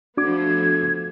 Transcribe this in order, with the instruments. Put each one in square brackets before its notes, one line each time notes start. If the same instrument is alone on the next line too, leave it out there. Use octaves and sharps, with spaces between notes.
[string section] F3 A3 B3 [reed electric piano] D4 F#4 D6 [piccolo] G#6